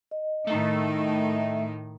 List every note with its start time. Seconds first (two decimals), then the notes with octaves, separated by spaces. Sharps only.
0.11 D#5
0.47 A2 D#3 A3 D#4